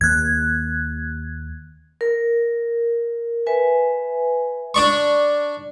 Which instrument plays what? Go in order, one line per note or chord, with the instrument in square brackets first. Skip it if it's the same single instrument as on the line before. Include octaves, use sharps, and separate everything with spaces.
[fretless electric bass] D#2 A#3 [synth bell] F#6 G#6
[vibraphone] A#4
B4 E5 G#5
[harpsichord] D4 D5 C#6